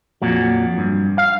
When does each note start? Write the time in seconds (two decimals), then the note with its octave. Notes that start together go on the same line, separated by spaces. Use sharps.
0.22 F2 A#2 F#3
0.78 G2
1.18 F5